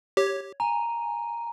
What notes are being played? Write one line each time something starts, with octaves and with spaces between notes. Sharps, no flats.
G4 C#5
G#5 A#5